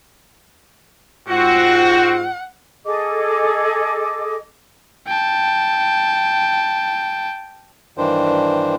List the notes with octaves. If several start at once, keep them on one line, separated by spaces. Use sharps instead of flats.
G#2 C4 F4 F#4 F#5
G#4 A4 D#5 D6
G5 A5
G2 D#3 E3 D4 C5